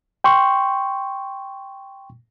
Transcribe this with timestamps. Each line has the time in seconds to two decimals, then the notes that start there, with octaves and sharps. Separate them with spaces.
0.24 G5 C6 C#6